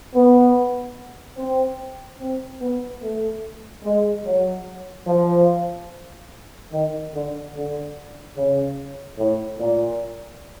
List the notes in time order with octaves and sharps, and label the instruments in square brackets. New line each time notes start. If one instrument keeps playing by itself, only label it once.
[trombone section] B3
C4
C4
B3
A3
G#3
F#3
F3
D#3
D3
D3
C#3
A2
A#2